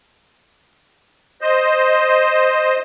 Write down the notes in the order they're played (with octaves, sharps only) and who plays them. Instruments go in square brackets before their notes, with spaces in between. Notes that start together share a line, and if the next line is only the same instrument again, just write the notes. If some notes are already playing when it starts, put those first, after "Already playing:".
[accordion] C5 D#5